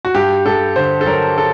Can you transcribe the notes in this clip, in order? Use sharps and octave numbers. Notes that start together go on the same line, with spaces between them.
F#4
G2 G4
G2 A4
D3 C5
A4
F#3 A#4
A4